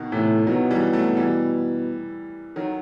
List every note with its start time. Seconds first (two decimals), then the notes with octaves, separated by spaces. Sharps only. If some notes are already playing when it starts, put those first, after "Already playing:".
Already playing: B2 D#3
0.12 A2 C3 E3
0.47 B2 D#3 F#3
0.71 E3 G3
0.93 F#3 A3
1.17 E3 G3
2.56 D#3 F#3